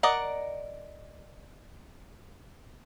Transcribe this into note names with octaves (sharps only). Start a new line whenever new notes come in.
A#4 D5 D#5 F#5